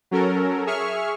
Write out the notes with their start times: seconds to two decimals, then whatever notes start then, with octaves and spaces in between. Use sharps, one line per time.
0.11 F#3 C#4 A4 A#4
0.66 G#4 E5 C#6 F6